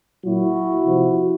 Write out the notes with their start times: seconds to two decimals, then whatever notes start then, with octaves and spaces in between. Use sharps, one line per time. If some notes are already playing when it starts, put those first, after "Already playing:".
0.24 A#2 F#3 E4 F#4
0.85 C3 F3